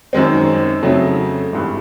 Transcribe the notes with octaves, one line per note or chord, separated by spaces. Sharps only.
F#2 D#3 G#3 C4
F2 C#3 F#3 A3
G#1 G2 E3